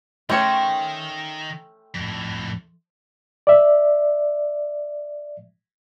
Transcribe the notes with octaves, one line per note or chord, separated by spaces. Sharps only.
D#3 A3 C#4 C#5 G5 C6
F2 A2
D5 E5